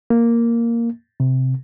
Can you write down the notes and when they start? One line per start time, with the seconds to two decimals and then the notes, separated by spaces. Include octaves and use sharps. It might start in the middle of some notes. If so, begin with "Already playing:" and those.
0.10 A#3
1.20 C3